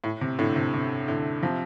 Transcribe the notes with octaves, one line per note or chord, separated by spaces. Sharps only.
A2
C3
A2 D3
C3
C3
A2 D3
C3 F3